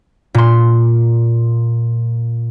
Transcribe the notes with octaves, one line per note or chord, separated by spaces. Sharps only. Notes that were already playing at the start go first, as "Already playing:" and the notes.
A#2 C6